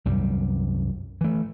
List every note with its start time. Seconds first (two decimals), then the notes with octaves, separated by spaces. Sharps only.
0.05 C2 F#2 G3
1.21 E3 A3